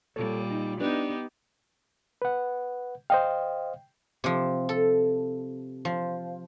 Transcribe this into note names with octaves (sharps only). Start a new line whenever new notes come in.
A#2 G3 A4 C#5
D#4
B3 D4 D#4 G4 B4
B4 F#5
C5 D#5 F5 G5
C3 F3
A4
F3